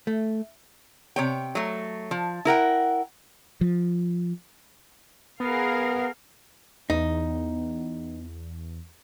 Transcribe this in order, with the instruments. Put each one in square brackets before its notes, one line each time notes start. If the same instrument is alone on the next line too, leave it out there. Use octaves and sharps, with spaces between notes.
[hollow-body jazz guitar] A3
[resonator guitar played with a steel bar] C3 C#5 G5
F#3 A3
F3
E4 A#4 F#5 G5
[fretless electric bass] F3
[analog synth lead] B3 [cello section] G#4 A#4 F5
[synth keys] E2 [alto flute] B3 [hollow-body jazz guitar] D#4